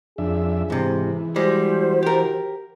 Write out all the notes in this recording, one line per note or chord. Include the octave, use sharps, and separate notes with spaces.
F2 D4 G#4 E5
G#2 C3 E3
G3 G#3 F#4 C5
G4 A#4